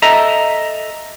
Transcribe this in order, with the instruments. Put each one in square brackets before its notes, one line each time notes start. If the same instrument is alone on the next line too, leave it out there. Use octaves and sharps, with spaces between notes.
[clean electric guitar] A4 D#5 E5 A#5